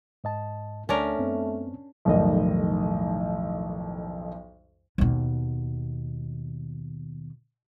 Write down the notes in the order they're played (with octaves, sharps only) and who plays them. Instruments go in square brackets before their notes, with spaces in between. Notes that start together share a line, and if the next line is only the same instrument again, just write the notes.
[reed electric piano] G#2 D#5 A5
[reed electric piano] D2 [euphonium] A3 [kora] C#4 D4 A#4
[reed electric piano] F#2 B3 C4
[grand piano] B1 F2 A2 D#3 G3 D#5
[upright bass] D#2 B2